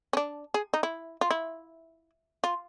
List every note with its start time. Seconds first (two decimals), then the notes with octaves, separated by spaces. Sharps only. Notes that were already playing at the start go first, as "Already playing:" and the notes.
0.13 C#4
0.17 D4
0.54 G#4
0.74 D#4
0.83 E4
1.21 F4
1.31 E4
2.44 F4